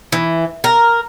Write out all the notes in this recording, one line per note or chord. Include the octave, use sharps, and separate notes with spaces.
E3
A#4